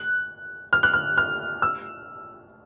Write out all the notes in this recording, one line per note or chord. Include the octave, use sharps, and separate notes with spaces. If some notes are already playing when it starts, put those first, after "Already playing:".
Already playing: F#6
F6
F#6
F6
F6
E6